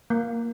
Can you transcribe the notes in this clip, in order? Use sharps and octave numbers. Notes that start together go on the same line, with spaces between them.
A#3